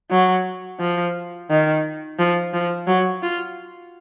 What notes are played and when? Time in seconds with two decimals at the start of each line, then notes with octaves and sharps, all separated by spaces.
0.11 F#3
0.80 F3
1.50 D#3
2.19 F3
2.53 F3
2.87 F#3
3.23 F4